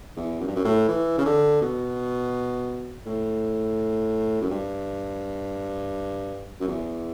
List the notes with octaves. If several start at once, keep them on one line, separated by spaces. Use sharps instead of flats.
E2
F#2
G2
F#2
A2
E3
C#3
D3
B2
A2
F#2
G2
F#2
E2